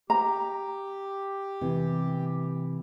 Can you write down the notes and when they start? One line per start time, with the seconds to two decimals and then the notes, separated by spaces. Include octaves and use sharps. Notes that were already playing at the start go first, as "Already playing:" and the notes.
0.10 G4 A#5
1.61 C3 E3